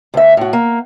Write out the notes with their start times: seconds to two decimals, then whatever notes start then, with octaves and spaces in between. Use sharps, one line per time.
0.14 D2 E5
0.37 A2 F#4
0.53 A#3